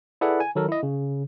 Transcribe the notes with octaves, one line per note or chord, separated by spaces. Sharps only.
E4 G#4 A4 B4 D5 F#5
G#5
D#3 F#3 A4 A#4
E4 D#5
C#3